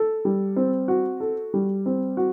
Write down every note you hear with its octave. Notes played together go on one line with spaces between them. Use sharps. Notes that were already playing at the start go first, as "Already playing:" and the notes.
Already playing: A4
G3
C4
F#4
A4
G3
C4
F#4